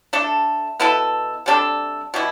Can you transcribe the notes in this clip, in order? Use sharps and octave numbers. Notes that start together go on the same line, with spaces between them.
A3 D4 A4
B2 B3 E4 A4
C3 G3 D4 A4
B2 G3 B3 E4